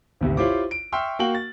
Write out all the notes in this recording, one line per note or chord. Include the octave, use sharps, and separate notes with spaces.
G#1 D2 C3
E4 F4 G4 C5 C#5 D6
D7
E5 G5 C6 C#6 E6 F6
A#3 F#4 F5 G5 C#6 F#7
A6